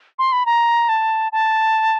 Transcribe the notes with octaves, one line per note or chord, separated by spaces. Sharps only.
C6
B5
A#5
A5
A5